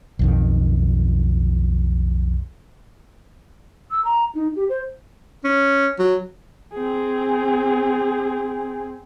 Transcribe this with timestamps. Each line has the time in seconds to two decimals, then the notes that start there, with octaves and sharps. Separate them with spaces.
0.19 B1 F2 D#3
3.91 E6
4.04 A#5
4.35 D#4
4.56 G4
4.69 C5
5.44 C#4
5.99 F#3
6.74 C4 G#4